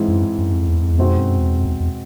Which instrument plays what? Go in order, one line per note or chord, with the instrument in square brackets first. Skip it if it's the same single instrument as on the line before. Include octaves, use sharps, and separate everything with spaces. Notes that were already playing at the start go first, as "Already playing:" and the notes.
Already playing: [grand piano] G#2 E3 G#3 C4 E4
[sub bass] F#2
F#2
F2
E2
F2
E2
[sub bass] F2 [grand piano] B2 G#3 C4 D#4 F#4
[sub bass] F#2
E2
F2
E2
E2